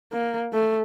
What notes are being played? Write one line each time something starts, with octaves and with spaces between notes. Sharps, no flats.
A#3
A3